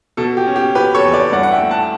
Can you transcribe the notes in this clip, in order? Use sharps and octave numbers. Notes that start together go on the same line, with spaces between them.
B2 A4
G4
C#4
G4
B2 G4 B4
A4 C#5
E2
B4 D5
G2 D5 F#5
F#5
E5 G5
A3
F#5 A5